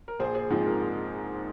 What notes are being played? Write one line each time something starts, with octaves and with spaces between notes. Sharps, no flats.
A#4
A#1 G#4 C5
G#4 C5
G#2 F3 C4 G#4
A#4